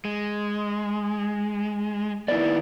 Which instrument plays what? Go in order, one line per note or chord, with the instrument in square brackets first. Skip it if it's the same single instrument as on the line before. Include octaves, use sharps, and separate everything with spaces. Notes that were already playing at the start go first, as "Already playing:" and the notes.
[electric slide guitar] G#3
[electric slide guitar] D#3 A#3 B3 [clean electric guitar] E4 D5